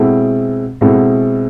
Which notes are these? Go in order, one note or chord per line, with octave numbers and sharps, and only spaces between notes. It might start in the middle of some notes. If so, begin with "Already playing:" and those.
Already playing: B2 G#3 C4 E4 A4
B2 G#3 C4 E4 A4